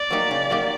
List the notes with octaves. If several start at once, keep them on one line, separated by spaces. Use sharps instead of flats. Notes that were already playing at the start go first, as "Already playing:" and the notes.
Already playing: D5
F#3 A#3 D#4 G4
C#3
F#3 A#3 D#4 G4